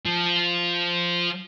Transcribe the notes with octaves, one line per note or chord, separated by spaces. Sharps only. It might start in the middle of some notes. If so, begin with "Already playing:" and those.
F3